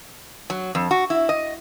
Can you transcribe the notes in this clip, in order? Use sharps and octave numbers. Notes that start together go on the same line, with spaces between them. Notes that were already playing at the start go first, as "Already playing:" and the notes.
F#3
F2
F#4
E4
D#5